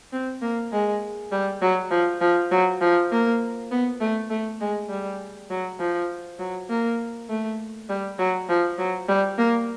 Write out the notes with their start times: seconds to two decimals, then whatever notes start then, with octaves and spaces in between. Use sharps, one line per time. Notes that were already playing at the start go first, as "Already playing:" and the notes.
0.13 C4
0.42 A#3
0.72 G#3
1.32 G3
1.62 F#3
1.91 F3
2.21 F3
2.51 F#3
2.81 F3
3.11 A#3
3.71 B3
4.01 A3
4.30 A3
4.61 G#3
4.90 G3
5.50 F#3
5.80 F3
6.39 F#3
6.69 A#3
7.29 A3
7.89 G3
8.19 F#3
8.49 F3
8.78 F#3
9.08 G3
9.38 A#3